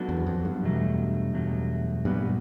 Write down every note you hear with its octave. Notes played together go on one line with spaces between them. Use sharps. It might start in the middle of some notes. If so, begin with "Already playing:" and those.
Already playing: F#3 B3 D4 F#4 A4
E2
F2
G2
E2 B2 F#3 A3
E2 B2 F#3 A3
G2 A#2 F#3 B3